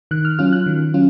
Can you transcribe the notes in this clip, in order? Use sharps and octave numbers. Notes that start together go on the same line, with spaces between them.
D#3 F#6
F6
F#3 C#4 F4 F6
F#6
D#3
F#3 C#4 F4